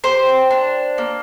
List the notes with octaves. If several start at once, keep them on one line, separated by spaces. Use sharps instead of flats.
G4 C5
D4
A#3